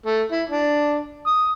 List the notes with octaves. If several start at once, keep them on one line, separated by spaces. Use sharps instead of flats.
A3
E4
D4
D#6